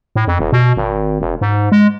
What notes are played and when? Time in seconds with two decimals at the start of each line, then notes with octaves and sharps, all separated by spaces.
0.16 A2
0.27 F2
0.39 D#1
0.52 B2
0.77 G#1
1.21 E1
1.41 G#2
1.72 G#3